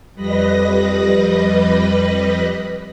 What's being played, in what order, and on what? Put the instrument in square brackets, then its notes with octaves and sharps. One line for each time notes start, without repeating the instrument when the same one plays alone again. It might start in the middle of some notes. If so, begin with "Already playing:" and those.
[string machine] F2 G3 B4 D#5 B5 A#6